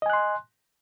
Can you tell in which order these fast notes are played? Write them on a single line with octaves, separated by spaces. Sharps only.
D#5 G#5 F#6 C6